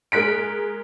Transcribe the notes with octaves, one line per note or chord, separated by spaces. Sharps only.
G#3 A#4 F#6 B6 D7